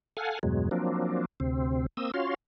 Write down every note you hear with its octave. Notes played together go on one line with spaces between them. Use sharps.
A4 F5 F#5 G#5
E2 G2 B2 F#3 G#3
F3 F#3 A#3 C4 D4
D2 C3 C4
A#3 C4 D#6 E6
C#4 F4 F#4 C#5 F5 C6